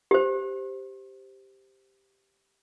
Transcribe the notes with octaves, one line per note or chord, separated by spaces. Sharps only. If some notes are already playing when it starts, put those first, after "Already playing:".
G4 C5